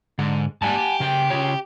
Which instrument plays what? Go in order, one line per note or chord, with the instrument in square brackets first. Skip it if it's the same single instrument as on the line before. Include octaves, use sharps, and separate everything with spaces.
[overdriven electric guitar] G#2 [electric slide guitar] D3
[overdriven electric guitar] G#2 G3 [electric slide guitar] F#5 G#5 A5
[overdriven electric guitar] G4
[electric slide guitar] C#3 G5
C#3 F4 C#5